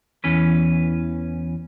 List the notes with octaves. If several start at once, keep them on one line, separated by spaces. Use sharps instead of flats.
E2 E3 C#4 B4